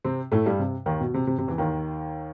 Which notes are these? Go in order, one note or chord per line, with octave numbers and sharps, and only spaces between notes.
C3 C4
A2 A3
G2 G3
C3
D#2 D#3
B2
C3
C3
C3
E2 E3
D#2 D#3